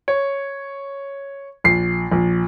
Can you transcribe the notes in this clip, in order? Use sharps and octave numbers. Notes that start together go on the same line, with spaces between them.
C#5
A#1 C7
A#1